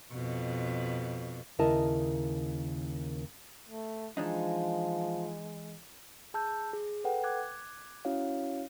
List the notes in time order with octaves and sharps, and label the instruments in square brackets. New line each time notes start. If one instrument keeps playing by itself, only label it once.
[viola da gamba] F2 B2
[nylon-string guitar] D#2 C#3 E4 A#4 D#5 A5
[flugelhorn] A3
[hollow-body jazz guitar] E3 D4 D#4 [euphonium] F3 [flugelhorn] G#3
[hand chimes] G#4 A5 E6 G6
G#4
A4 B4 F#5 G5
D6 F#6 G#6
C#4 E4 F#4 C#5 F5